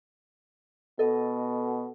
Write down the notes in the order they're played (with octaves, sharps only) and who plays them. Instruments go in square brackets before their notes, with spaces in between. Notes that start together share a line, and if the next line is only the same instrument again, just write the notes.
[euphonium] B2 [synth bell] A4 D#5